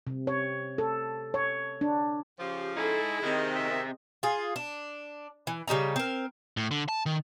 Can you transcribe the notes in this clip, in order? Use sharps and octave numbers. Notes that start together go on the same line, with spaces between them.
C3
C#5
A4
C#5
D4
C#3 F3 G4
D#4 E4 G#4 A4
C3 D#3 C4 G#4 D#5
E5
F4 G#4
D4
E3
C#3 G3 D#4 A#5
C4 A#4
A2
D3
A5
D#3